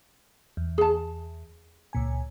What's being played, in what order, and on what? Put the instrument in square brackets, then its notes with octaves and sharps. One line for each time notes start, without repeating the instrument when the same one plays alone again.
[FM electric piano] E2
[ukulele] G#4 A5
[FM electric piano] C#2 A#2 G#5